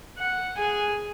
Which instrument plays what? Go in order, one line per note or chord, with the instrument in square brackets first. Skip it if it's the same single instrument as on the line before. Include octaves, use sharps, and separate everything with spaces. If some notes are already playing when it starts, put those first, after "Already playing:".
[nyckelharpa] F#5
G#4 G#5